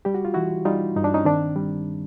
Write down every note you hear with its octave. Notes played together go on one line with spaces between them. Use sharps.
G3 G4
F#4
F4
E3 E4 F#4
G3 D#4 F4
G2 D#4
D4
C#4 D#4
D#3 C4 D4
G3